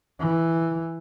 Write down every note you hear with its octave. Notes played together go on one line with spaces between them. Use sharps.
E3